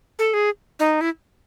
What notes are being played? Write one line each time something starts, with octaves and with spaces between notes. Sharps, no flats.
A4
G#4
D#4
E4